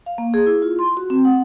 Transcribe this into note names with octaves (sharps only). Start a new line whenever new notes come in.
F5
A#3
G#4
E4
F4
C6
F#4
C4
F#5